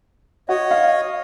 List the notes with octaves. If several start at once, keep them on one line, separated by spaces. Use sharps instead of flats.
F#4 C#5 D#5
F5